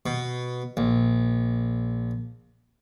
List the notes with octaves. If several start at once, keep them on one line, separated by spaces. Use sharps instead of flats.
B2
A#1